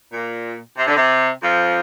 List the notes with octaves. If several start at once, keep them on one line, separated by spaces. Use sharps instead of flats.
A#2
C3
D3
C3
F2 F3